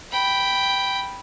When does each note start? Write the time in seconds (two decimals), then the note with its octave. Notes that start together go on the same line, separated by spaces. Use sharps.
0.12 G5 B5